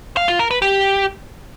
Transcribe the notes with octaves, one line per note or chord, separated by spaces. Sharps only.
F5
F4
A#4
B4
G4